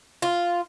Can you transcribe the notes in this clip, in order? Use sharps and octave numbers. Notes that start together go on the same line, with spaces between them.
F4